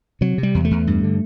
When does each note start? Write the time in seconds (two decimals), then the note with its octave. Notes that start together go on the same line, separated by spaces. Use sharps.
0.21 C3 F#3
0.38 C3
0.43 G3
0.55 E2
0.65 A3
0.71 E2
0.87 G2
1.03 D3